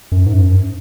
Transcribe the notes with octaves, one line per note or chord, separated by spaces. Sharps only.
F#2
G#2
F#2